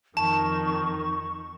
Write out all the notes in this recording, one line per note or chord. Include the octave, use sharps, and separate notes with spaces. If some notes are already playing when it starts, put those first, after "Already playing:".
F2 D#3 A5 C#6